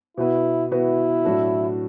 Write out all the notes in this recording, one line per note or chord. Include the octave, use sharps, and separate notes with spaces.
B2 B3 E4 F#4 B4
B2 B3 E4 F#4 B4
A2 F#3 D4 F#4 A4